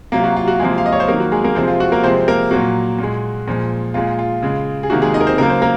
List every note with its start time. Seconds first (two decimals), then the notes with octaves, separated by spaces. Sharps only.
0.12 C3 F#3 A#3 F4
0.24 F#4
0.37 F4
0.48 F#4
0.60 C3 F3 G#3 A#3 G#4
0.78 F5
0.86 D#5
0.93 C#5
1.00 C5
1.08 D#3 F#3 A#3 A#4
1.20 F#4
1.32 G#3 G#4
1.44 A#3 A#4
1.55 C3 F3 G#3 C4 C5
1.68 F4
1.80 F#4
1.92 A#3 A#4
2.03 C3 F3 G#3 C4 C5
2.28 A#3 A#4
2.51 A#2 F#3 A#3 F#4
2.99 A#2 G#3
3.48 A#2 F3 G#3
3.94 A#2 G#3 F4
4.19 F4
4.43 C#3 G#3
4.83 G#4
4.90 C3 D#3 A#3 F#4
5.02 G#3 G#4
5.14 D#4 D#5
5.21 A#4
5.27 C4 C5
5.38 C#3 F#3 A#3 A#4
5.49 C5
5.62 A#3 A#4